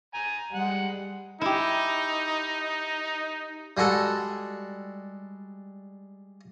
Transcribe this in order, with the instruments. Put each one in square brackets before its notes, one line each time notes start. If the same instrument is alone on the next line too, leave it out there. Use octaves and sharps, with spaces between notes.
[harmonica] G#5 A#5
[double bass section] G3 [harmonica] G#3 F#5
[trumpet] D#4 [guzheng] E4 G4
[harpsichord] G3 G#3 F#4 A4